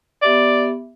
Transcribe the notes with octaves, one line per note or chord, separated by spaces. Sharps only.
B3 G4 D5 E5